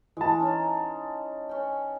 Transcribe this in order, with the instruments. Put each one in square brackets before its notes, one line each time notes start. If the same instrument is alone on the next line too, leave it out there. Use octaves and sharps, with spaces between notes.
[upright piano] E3 A5 [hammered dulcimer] G#3
[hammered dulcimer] C#4 D#4
C#4 G5